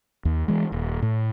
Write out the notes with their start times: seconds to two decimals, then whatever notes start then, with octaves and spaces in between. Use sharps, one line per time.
0.25 D#2
0.48 E3 G#3
0.72 D#1
1.02 A2